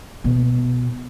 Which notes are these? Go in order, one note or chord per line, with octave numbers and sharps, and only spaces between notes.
B2